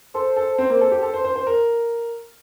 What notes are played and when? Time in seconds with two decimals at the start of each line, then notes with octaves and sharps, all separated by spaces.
0.14 A4 C5
0.36 A4
0.58 C4
0.70 A#3
0.81 A4
0.92 G4
1.03 A4
1.14 C5
1.24 C5
1.36 C5
1.47 A#4